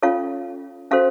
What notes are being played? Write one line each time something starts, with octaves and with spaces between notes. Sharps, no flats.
C#4 F4 A4 C#5 F5
C#4 F#4 A4 C5 F5